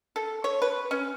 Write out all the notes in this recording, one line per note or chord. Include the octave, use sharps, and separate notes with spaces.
A4
C#5
B4
C#4